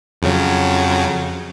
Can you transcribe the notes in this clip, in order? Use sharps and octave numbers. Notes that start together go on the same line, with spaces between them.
F2 C#3 F#3